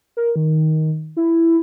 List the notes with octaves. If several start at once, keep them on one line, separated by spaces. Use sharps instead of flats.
A#4
D#3
E4